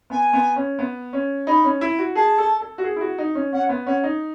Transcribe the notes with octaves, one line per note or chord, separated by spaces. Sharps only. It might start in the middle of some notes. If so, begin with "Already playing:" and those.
B3 G#5
B3
C#4
B3
C#4
D#4 B5
C#4
E4
F#4
G#4 A5
A4
A4
F#4
G#4
E4
F#4
D#4
C#4
C#4 F#5
B3
C#4 F#5
D#4